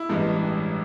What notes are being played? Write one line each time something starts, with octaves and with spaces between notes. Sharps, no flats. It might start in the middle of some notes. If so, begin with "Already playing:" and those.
Already playing: E4
A1 G2 E3 G#3